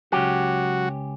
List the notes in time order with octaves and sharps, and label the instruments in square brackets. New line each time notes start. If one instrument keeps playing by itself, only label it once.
[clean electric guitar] C#2 C#4 G4 [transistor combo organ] F#3 F#4